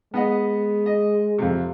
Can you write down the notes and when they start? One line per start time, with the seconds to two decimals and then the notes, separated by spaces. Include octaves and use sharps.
0.14 G#3 B3 D#5 F#5
0.86 D#5
1.38 F2 C3